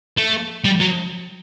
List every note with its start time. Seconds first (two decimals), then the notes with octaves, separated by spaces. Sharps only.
0.17 A3
0.64 G3
0.80 F#3